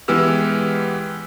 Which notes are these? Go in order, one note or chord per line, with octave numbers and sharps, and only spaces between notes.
E3 G#3 B3 G4 E6 F6